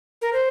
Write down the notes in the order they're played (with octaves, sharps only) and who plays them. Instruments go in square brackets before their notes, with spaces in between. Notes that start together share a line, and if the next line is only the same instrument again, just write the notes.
[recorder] A#4
C5